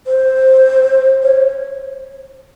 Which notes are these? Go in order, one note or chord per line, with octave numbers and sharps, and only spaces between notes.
C5
C#5